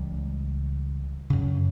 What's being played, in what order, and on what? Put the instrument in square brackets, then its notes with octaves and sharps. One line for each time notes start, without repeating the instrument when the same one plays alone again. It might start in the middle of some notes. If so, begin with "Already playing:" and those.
Already playing: [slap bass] C#2 C#3 E3 G3
F#2 C#3